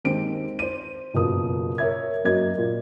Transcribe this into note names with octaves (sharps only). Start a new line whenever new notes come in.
D#2 G#3 C4 D7
C5 D#7
F#1 B2 A#3 F4 D#6
A#4 C#5 E5 G#6
F#2 A#3 F#4 D#5 G#6
A#2